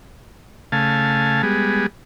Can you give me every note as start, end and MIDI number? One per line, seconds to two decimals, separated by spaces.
0.72 1.42 49
0.72 1.42 57
0.72 1.42 77
0.72 1.42 80
0.72 1.42 81
1.43 1.86 55
1.43 1.86 56
1.43 1.86 59
1.43 1.86 68